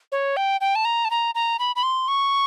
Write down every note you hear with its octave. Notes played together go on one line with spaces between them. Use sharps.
C#5
G5
G5
A5
A#5
A5
A#5
A#5
B5
B5
C6
C#6